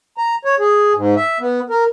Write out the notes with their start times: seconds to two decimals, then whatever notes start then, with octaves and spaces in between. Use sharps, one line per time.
0.18 A#5
0.45 C#5
0.59 G#4
0.95 G#2
1.16 E5
1.40 B3
1.70 A#4